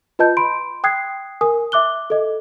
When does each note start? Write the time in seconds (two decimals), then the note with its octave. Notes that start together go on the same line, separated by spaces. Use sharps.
0.19 F4 B4 D#5 A5 G6
0.37 B5 C6 D7
0.84 G5 D#6 F#6 G#6 C7
1.41 A#4 G#5 D#6
1.72 E5 D6 F#6 G7
2.10 A4 D#5